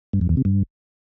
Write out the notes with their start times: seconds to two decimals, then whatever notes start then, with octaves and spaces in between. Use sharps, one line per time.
0.13 G2
0.21 F2
0.29 E2
0.37 C3
0.45 G2